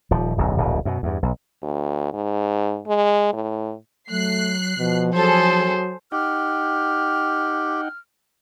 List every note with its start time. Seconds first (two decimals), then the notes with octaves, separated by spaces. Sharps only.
0.11 D#1 F3
0.38 D1 B1 F#2
0.57 D1 A#1 B2
0.85 F#2 B2
1.03 E2 G2
1.23 B1
1.63 D2
2.14 G#2
2.87 G#3
3.33 A2
4.10 F#3 A3 F#6 C7
4.78 B2 F3
5.15 F#3 G#4 A4 C5
6.12 D#4 G4 F#5 G5 F6